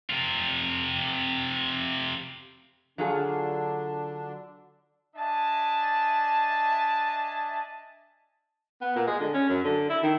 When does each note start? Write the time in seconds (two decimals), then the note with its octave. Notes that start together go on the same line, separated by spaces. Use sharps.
0.10 C3 F4
2.98 D3 F#3 D4 F4 G#4
5.16 D4 D#5 E5 G#5 A5
8.81 B3
8.95 A#2
9.07 G#3
9.20 D3
9.34 C#4
9.49 F#2
9.64 D3
9.89 E4
10.03 D#3